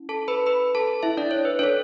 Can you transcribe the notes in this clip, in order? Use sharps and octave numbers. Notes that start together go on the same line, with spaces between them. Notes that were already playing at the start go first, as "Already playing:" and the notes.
Already playing: C#4 E4
A4 A5
B4 B5
B4 B5
A4 A5
E4 E5
D4 D5
C#5
B4
D4 A4 C#5